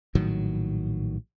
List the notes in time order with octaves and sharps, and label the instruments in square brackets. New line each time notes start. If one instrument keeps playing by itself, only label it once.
[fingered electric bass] A#1 A2 D#3 F#3